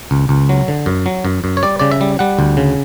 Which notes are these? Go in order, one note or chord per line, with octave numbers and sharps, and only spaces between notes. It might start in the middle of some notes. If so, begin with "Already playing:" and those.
C#2
C#2
F#3
D3
F#2
F#3
F#2
F#2
C#5
G3 D5
C#3 D5
E5
G3
G3 F#5
D2
C#3